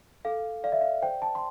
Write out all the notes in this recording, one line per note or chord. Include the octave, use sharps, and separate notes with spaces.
A4 F5
D5 F5
E5
F5
C5 G5
A5
C6